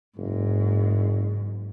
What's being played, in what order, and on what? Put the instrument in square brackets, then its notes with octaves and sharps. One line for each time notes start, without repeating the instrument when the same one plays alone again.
[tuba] F#1 [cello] G#2